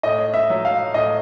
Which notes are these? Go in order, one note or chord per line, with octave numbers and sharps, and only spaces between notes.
A2 D#5
E5
F#3
F5
A2 D#5